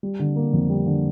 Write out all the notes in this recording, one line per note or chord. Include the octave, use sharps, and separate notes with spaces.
G3
D3
A#3
F2
G3
D3